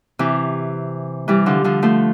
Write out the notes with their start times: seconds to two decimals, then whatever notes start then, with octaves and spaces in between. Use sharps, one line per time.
0.19 C3 E3
1.28 E3 G3
1.46 D3 F3
1.64 D3 F3
1.82 F3 A3